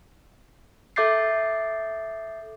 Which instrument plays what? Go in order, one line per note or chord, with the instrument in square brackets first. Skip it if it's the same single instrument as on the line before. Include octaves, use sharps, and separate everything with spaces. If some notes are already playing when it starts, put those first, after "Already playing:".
[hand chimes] A4 E5 D6 G6 A6 C7